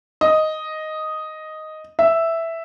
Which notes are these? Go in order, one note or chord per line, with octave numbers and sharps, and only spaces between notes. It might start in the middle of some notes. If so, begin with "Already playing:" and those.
D#5
E5